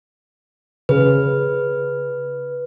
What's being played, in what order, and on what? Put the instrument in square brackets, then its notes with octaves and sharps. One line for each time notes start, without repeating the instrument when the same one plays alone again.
[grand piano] C#3 [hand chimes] B4